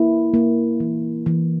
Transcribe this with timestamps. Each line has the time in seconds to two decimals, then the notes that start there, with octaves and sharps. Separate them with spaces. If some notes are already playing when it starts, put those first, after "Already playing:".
Already playing: A#3 E4
0.34 A#3
0.80 E3
1.26 E3